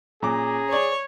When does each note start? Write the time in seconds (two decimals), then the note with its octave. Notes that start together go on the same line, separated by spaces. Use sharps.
0.23 A#2 C#4 G#4 A#5 D6
0.72 C#5 D5